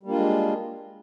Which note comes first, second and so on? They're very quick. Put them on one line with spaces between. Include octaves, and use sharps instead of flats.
G3 A#3 D4 F4 G#3